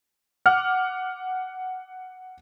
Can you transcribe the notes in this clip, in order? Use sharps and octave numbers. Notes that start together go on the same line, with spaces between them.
F#5 D6 F6